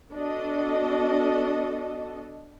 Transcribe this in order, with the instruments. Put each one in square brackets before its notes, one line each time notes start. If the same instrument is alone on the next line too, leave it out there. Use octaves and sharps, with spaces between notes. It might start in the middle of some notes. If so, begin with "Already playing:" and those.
[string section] B3 D4 F#4 A4 D#5